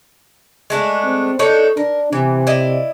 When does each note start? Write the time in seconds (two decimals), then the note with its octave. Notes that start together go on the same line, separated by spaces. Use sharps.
0.70 G#3 A3 D4
1.05 C4
1.39 D4 D#4 A4 C#5
1.77 D4 A#4
2.13 C3 E3
2.47 E4 D5 D#5